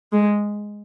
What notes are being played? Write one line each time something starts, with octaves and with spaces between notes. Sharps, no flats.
G#3